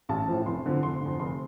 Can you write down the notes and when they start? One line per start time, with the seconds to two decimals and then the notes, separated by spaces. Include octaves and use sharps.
0.09 A1 A5
0.28 A2 F3
0.46 F1 C6
0.65 F2 D3 F3
0.82 F1 C6
1.01 F2 D3
1.19 F1 C6